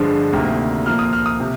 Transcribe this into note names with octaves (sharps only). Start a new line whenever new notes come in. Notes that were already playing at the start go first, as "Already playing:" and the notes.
Already playing: G2 D3 F3 G#3
D2 C3 D#3 A#3
A#2 F3 A#3 F6
D#6
F6
D#6
C3